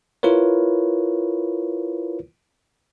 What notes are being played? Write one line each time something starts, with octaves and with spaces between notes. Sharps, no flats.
E4 F4 A#4 B4 C#5